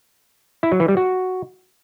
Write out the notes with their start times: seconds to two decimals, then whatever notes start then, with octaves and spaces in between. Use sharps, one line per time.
0.63 E4
0.71 F#3
0.80 E3
0.88 G3
0.97 F#4